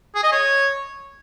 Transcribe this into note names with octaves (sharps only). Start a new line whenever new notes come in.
G#4
D#5
C#5